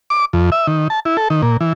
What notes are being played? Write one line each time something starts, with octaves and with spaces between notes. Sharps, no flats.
D6
F2
E5
D#3
A5
E4
A4
D#3
A#2
E3